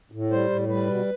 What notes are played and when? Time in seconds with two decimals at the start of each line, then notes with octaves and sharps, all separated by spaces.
0.12 A2
0.31 G3 C5
0.50 A2
0.68 G3 B4
0.87 B2